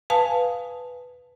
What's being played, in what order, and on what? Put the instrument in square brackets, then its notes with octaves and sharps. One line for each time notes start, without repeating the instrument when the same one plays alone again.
[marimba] B4 F5 G#5 A5 D#6